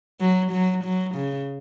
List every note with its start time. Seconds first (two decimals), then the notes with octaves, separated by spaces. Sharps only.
0.21 F#3
0.52 F#3
0.84 F#3
1.15 C#3